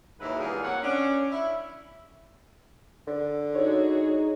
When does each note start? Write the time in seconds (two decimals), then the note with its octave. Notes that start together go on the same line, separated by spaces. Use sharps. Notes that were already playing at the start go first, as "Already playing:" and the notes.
0.20 D#2 G#2 F#3 E4 B4 E5
0.39 E2 G2 A#2 G#4 A#4 F5
0.63 A#3 C4 C#5 F#5
0.82 C#4 D4
1.31 E4
3.07 D3
3.55 D#4 F#4 G#4 C#5